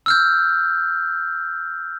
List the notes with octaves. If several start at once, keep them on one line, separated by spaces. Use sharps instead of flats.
E6 F6 G6